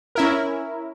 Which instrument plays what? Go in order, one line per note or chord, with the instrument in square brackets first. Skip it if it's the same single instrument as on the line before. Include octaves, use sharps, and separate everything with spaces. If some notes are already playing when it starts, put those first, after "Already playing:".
[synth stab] C#4 E4 A#4